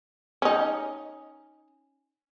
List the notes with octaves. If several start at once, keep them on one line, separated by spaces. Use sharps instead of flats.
C#4 D#4